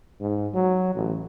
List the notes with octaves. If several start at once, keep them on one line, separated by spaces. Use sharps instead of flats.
G#2
F#3
A1